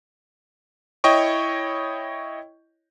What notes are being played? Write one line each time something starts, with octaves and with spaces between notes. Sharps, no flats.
E4 C#5 D#5 G5 C#6